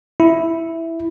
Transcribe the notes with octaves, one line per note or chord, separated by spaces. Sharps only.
E4